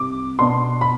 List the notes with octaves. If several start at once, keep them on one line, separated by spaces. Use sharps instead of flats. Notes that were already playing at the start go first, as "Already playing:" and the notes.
Already playing: C2 D6
B2 B3 D4 C6
B5